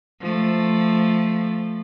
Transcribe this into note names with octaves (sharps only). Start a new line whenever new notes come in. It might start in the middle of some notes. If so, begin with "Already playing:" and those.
F3 A3